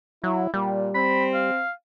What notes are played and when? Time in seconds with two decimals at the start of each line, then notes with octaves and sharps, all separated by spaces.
0.24 F#3 E4
0.54 A#2 G3
0.95 C4 B5
1.34 F5